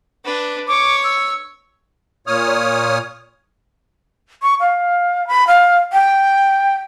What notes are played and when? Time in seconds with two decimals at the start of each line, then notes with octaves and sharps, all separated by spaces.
0.25 D4 B4
0.68 C#5 C#6 D6
1.04 E6
2.27 A#2 C#5 D#6 F6
4.43 C#6
4.60 F5
5.28 B5
5.47 F5
5.93 G5